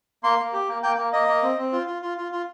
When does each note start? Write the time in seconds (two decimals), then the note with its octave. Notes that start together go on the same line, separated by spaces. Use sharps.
0.24 A#3 C6
0.38 A#3
0.53 G4
0.69 A#3
0.83 A#3 G5
0.97 A#3
1.13 A#3 D#5
1.27 A#3
1.42 C4
1.58 C4
1.72 F4
1.87 F4
2.02 F4
2.18 F4
2.32 F4